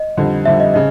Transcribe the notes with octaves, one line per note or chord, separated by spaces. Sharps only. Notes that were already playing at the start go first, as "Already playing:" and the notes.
Already playing: D#5
F2 D3 G3
F2 D3 G3 E5
D#5
C#3 D#5